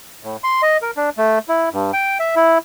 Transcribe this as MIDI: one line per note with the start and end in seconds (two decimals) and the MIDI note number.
0.23 0.37 45
0.44 0.62 84
0.62 0.77 75
0.82 0.91 70
0.97 1.10 62
1.18 1.39 57
1.49 1.69 64
1.72 1.91 43
1.93 2.18 79
2.20 2.35 76
2.36 2.58 64